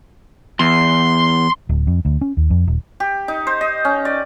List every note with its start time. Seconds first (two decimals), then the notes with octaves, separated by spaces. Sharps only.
0.60 E2 C6
1.69 D1
1.87 F2
2.05 D2
2.21 C#4
2.37 D#2
2.50 F2
2.67 D#1
3.00 G4
3.28 D#4
3.47 C5
3.61 D#5
3.85 C#4
4.05 D5